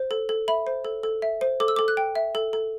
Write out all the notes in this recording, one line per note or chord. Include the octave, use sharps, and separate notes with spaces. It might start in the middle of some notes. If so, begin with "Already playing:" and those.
Already playing: C5
A4
A4
E5 B5
C5
A4
A4
E5
C5
A4 D6
E6
A4 D6
F#6
G5
E5
A4
A4